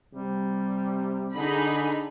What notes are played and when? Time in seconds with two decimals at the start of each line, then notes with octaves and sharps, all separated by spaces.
0.13 C3 G3
1.34 D3 D4 D#4 G#4 B5